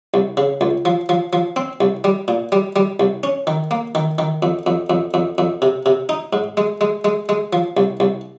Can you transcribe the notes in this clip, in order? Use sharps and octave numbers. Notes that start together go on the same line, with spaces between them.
C2
C#3
C#2
F3
F3
F3
C4
C2
G3
A#2
G3
G3
C2
C#4
D#3
A#3
D#3
D#3
F2
F2
F2
F2
F2
C3
C3
D#4
G#2
G#3
G#3
G#3
G#3
F3
C2
C2